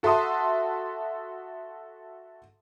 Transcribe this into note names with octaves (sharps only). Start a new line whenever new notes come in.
F#4 A4 E5 A5 C6 D#6